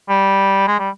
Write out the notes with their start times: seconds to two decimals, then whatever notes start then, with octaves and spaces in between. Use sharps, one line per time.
0.09 G3
0.67 G#3
0.79 G3